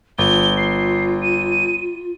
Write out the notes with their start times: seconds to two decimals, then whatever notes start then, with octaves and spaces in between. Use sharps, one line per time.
0.19 G1 F4 G7
0.57 C7
1.22 D#7